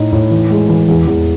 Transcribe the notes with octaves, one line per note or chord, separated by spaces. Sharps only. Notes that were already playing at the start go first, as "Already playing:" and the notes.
Already playing: A2 D#4
A2
E3
G#3
E3
E2
E2